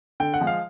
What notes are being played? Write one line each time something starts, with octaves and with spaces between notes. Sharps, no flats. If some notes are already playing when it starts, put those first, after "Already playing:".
D3 G5
F#5
F3 G#3
F5